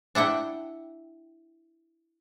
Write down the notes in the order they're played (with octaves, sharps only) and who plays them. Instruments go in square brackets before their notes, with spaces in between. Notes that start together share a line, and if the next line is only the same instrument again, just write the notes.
[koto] D4 E4 F#5 G5